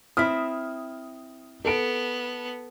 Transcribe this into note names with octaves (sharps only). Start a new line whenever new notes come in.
C4 E4 D#6 F6 B6
B3 A4 D7